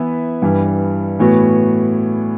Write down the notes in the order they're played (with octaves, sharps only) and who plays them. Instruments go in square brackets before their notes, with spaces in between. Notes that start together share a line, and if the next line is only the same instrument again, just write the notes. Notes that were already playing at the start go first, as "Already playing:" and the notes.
Already playing: [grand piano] E3 B3 E4 B4 E5
G2 E3 G3
A2 E3 B3 F#4